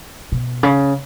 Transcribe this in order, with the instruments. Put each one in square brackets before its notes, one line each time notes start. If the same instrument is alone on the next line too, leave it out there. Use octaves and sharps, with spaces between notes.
[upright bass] B2
C#3